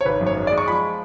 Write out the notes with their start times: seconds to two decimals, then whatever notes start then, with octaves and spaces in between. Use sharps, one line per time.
0.01 C#5
0.05 G#1 B4
0.21 F#2
0.26 C#5
0.37 G#3
0.47 D5
0.52 G#3
0.58 C#6
0.68 F3 B5